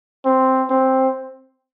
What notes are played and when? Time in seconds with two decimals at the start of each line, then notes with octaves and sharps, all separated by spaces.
0.25 C4
0.70 C4